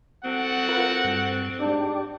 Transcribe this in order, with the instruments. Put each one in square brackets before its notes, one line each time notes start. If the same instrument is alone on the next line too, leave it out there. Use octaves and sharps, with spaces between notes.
[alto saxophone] C4 [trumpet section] F#4 A4 F#5
[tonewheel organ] F4 A#4 B4
G2
[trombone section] G#2 D4 [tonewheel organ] G4 D5